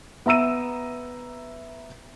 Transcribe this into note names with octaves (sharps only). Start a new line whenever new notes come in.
B3 E5 A#5 E6 D#7